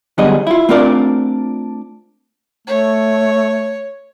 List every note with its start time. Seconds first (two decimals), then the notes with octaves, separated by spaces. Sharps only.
0.18 D3 F#3 G3 B3 G#4 D#5
0.47 E4 F4
0.69 A3 C4 D4 F4 A#4 D5
2.67 A3 C#5